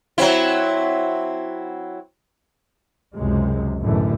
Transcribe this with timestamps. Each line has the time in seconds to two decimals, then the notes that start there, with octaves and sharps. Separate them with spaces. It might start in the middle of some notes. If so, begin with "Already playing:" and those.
0.18 F#3 C4 E4
3.16 C#2 F#2 C3 G#3
3.81 A1 F#2 B2 D3 E3 A3